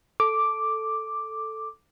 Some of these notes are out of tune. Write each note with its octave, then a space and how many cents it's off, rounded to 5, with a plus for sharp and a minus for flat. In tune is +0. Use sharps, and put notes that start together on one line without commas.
A4 +0 D6 +0